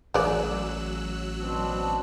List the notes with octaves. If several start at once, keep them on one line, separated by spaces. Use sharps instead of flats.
A1 F#3 G#3 D5 E6 F#6
B2 C4 D4